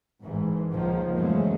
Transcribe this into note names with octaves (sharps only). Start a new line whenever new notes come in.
G#1 G#2 E3
C#2 D#3 F3 A#3
E2 C#3 F#3 G#3 A3 C#4